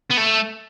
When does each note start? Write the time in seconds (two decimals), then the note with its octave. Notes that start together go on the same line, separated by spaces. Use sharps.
0.11 B3
0.18 A3